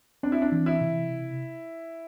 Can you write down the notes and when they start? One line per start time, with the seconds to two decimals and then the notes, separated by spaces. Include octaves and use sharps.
0.23 C4 D4
0.32 E4
0.42 D4
0.52 E3
0.66 E4
0.81 C3